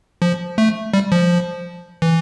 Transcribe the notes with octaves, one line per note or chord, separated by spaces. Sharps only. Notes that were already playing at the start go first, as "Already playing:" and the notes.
F3
A3
G3
F3
E3